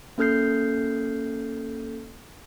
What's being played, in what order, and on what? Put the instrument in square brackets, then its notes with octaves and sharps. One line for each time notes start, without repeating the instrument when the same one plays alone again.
[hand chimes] A#3 C#4 A4 F6 G6 C7